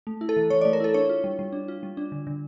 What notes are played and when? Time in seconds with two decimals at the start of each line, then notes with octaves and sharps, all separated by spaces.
0.07 A3
0.21 E4
0.29 A4
0.37 E3
0.50 E3 C#5
0.61 A3 D5
0.73 A#4
0.80 E4 A4
0.94 D4 C#5
1.09 F4
1.24 G3
1.39 G3
1.53 D4
1.68 F4
1.83 G3
1.97 D4
2.12 D3
2.27 D3